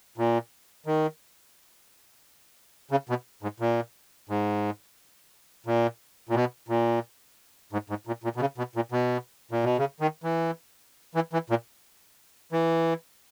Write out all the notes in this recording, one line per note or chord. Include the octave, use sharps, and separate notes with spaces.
A#2
D#3
C#3
B2
G#2
A#2
G#2
A#2
A#2
B2
A#2
G#2
G#2
A#2
A#2
B2
C#3
B2
A#2
B2
A#2
B2
C#3
D#3
E3
E3
E3
A#2
E3